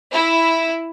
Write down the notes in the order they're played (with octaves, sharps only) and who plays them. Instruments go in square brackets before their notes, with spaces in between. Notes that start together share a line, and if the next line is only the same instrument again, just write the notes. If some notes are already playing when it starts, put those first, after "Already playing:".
[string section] E4